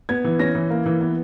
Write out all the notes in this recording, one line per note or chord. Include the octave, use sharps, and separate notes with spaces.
B3 G#6
E3
C#4 A#6
E3
A#3
E3
B3